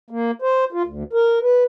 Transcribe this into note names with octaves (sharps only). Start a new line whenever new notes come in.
A#3
C5
F4
D2
A#4
B4